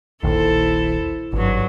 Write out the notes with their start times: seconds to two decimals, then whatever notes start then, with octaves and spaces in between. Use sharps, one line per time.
0.23 D#1 A#1 D#2 E4 A4 C5
1.33 G#1 G2 F#3